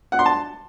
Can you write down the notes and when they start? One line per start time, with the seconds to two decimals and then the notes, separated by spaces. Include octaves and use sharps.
0.12 F#5
0.19 C6
0.26 A5